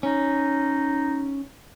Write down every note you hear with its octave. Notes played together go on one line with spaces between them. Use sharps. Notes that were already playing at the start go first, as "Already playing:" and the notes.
C#4 D#4